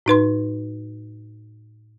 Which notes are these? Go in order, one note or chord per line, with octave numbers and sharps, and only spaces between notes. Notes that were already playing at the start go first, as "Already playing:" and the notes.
A2 D#4 B4 C6